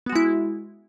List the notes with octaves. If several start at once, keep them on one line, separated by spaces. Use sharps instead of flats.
G#3 B3 E4 F#4